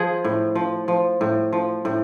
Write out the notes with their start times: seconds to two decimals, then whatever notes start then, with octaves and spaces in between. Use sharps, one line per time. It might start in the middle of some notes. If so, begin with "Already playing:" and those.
Already playing: F3 G#4
0.24 A2
0.55 F3
0.88 F3
1.21 A2
1.53 F3
1.85 A2